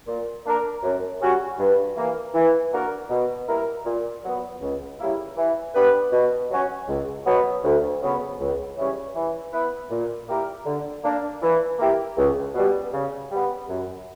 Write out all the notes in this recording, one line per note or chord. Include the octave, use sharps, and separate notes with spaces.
A#2
A#3 D4 A#4
F#2
C#3 G3 C#4 F#4
G2
E3 A#3
E3
A#3 D4 F#4 A#4
B2
G3 A#3 E4 A#4
A#2
F#3 B3
C#2
C#3 G3 A#3 E4
E3
B3 D4 G4 B4
B2
F#3 C#4 F#4
C#2
B2 F#3 B3
D2
C#3 F#3 B3
C#2
C#3 E3 G3 C#4
E3
B3 E4 B4
A#2
A#3 E4 G4 A#4
D3
A#3 D4
E3
A#3 E4 G4
C#2
B2 G3
C#3
G3 B3
F#2